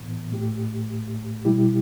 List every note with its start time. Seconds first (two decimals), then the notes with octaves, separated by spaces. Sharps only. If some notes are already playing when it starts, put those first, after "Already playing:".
Already playing: A2 E3 B3
0.31 A2 A3 G4
1.45 B2 G3 E4 G4